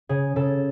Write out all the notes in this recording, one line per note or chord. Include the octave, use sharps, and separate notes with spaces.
C#3 G#4
C#3 A4